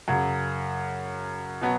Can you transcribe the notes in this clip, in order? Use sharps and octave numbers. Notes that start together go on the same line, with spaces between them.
F#2 C#3 F#3
B2 F#3 B3